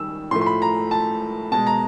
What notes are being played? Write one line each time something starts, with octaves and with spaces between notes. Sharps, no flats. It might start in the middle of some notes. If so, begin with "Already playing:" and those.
Already playing: D#3 G3 E6
A2 F3 A3 C6
C6
B5
A#5
A5
B2 G#3 A5
A#5